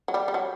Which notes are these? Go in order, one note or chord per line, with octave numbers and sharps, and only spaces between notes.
F#3
G3
G3
F#3